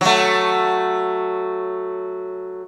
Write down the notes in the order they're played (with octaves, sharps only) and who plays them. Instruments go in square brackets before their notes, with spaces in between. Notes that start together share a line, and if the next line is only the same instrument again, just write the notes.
[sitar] F#3 A3